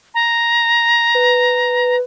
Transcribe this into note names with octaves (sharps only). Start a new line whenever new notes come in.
A#5
B4